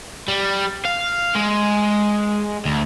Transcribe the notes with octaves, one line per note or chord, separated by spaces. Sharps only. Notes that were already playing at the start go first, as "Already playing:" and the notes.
G3
F5
G#3
D2